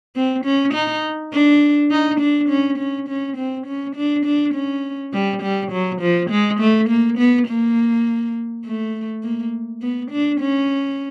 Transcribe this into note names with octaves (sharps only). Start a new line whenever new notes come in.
C4
C#4
D#4
D4
D#4
D4
C#4
C#4
C#4
C4
C#4
D4
D4
C#4
G3
G3
F#3
F3
G#3
A3
A#3
B3
A#3
A3
A#3
B3
D4
C#4